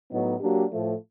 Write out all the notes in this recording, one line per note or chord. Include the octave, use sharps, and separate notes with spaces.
A2 F#3 B3 D#4
F#3 A#3 D4 G4
A2 F3 A3